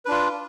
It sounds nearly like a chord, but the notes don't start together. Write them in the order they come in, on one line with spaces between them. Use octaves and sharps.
B4 D4 F4